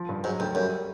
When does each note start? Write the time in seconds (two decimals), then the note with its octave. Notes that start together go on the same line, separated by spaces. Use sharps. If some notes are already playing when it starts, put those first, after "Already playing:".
Already playing: F3
0.09 G2
0.24 G#2 F#3
0.40 D2 G2
0.55 F#2 G3